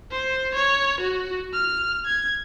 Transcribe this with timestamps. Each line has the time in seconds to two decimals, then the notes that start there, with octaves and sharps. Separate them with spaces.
0.11 C5
0.54 C#5
1.00 F#4
1.54 F6
2.06 G#6